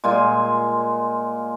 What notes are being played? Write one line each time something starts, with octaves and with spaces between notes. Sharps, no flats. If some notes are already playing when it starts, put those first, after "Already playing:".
A#2 G#3 F4 G#5